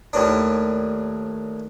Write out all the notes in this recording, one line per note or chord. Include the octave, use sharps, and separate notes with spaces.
D#2 A2 D4